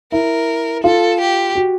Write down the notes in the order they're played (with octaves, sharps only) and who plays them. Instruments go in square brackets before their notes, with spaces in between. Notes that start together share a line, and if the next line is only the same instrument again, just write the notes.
[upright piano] E4 [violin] A#4
[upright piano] F4 [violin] A4
[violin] G4
[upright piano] F#4